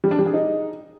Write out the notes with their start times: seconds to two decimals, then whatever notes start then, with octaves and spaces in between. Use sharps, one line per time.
0.04 G3
0.11 D4
0.19 G3
0.26 G#4
0.34 D#4